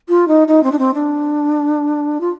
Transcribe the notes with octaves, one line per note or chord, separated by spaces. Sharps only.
F4
D#4
D#4
C4
D4
C4
D4
F4